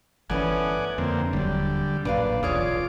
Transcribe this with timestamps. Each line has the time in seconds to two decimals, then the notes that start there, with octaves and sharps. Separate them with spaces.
0.30 G1 E3 A3 B3 C#4 D5 F#5 G#5
0.98 F2 D3 A#3 C4
1.33 D#1 D3 F#3 G3
2.05 A1 F#2 A#2 D4 B4 D5 F5
2.43 D1 B1 E2 F4 G#4 C#5 D5 D6